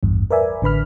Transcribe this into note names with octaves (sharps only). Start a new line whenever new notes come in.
A1 E2 G2
A#4 B4 D5 E5 G#5
A1 D3 B4 B5 F6